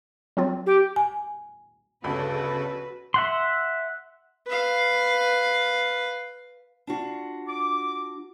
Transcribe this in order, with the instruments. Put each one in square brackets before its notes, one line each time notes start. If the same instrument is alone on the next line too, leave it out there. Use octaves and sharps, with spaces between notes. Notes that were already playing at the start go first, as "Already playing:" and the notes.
[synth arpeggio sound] F#3 C4 F4
[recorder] G4
[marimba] G#5
[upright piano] G1 D2 B5 [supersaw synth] C#3 A4 [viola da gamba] F#4 B4
[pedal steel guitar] E5 F#5 C6
[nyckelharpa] B4 F5
[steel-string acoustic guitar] D4 F4 F#4
[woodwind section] D6